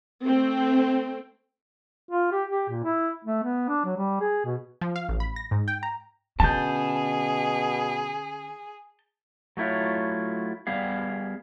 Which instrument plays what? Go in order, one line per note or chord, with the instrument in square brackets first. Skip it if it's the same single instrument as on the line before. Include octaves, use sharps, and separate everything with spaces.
[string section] A3 C4
[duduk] F4
G4
G4
A#2
E4
A3
B3
D4
F#3
G3
G#4
B2
[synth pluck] F3
F5
A1
B5
A#6
G#2
G5
A#5
[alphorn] B2 [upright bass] D3 C#4 [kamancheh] G#4 [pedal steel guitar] A5 G6
[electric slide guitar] F#3 A3 E4 F4 C#5
G3 B3 G#4 F5